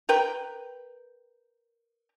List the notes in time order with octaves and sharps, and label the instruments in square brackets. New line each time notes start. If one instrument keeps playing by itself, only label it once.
[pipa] A#4 B4 G5